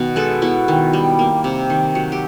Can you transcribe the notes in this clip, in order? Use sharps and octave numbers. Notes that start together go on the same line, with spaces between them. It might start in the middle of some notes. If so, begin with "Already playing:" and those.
Already playing: B2 D#3
G#3 A4 B4
B3 E4 F#4
D#3
G3
A#3
C3
D#3
F#3
G4